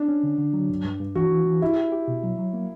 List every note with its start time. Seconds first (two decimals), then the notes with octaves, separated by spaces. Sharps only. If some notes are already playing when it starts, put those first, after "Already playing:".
Already playing: D4
0.08 C#4
0.23 D3
0.38 D3
0.53 F#3
0.69 G2
0.85 G2
1.00 G2
1.15 E3 F#4
1.31 E3
1.46 E3
1.61 E4 G4
1.76 G4
1.92 G4
2.08 B2
2.23 F#3
2.38 F#3
2.53 A#3